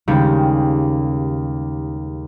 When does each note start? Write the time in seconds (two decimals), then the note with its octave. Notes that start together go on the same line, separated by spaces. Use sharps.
0.08 D#2 C#3 G3 G#3 G4 C#6